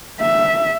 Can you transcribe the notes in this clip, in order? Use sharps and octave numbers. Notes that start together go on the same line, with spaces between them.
E5